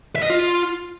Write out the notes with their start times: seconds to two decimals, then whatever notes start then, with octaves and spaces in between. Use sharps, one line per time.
0.16 E5
0.23 D#5
0.30 F4